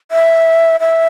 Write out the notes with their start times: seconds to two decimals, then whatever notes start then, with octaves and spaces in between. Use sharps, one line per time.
0.12 E5
0.80 E5